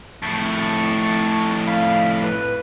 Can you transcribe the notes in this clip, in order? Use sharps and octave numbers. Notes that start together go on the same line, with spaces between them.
F2 A2 A5 C#6
F5 B5
B4